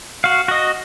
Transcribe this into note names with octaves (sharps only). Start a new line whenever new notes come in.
F#4 F5
F#4 D#5